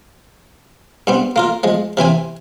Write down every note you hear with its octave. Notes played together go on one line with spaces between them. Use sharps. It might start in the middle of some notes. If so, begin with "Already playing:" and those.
G2 B3 C4
A#3 F4 A#4
F3 G#3
C3 E3 C4 G#5